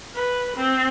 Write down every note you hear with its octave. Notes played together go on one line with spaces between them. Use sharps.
B4
C4